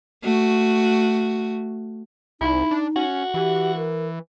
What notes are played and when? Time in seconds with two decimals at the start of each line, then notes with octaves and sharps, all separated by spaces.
0.23 A3 F#4
2.41 C2 D#4 E4
2.71 D4
2.96 C#4 F#4
3.34 E3 G4
3.77 A#4